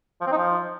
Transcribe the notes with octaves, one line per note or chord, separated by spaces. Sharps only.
F3
C4
D#4
F3